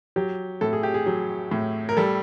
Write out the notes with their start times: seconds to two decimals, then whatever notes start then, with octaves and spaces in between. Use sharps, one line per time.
0.16 F#3 G4
0.61 A2 A4
0.73 G#4
0.83 G4
0.94 G#4
1.06 F#3
1.51 A2
1.89 A#4
1.97 G3 A4